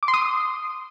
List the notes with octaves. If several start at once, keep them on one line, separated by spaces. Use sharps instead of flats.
D6
C6
D#6